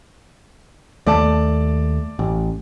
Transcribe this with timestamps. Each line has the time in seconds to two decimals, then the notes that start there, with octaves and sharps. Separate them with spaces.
1.07 D#2 A3 D5 A5
2.19 A1